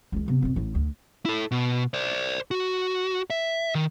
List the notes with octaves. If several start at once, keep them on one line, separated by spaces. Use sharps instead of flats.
C#2 D#3
C3 B3
F2 B2
A1 A2
D2
E4 A4
B2
C5 D5
F#4
E5
D#3